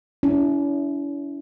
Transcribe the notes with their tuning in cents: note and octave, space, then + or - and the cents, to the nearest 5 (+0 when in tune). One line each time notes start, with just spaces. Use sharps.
C#4 +45 E4 +0